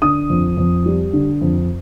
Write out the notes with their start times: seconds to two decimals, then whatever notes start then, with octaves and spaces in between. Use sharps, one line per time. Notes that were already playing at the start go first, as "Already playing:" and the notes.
0.02 D3 D#6
0.30 F2
0.57 F2
0.86 G3
1.13 D3
1.42 F2